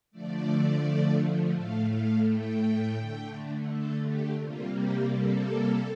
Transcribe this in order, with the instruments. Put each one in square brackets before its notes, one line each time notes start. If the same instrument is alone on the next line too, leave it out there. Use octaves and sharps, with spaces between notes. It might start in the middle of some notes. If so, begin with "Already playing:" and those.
[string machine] D3 F3 A3 D5
A2 A3 F5
F5
G5
D3 A3
A4
G4
C3 G3 A#3 F4
G4
A4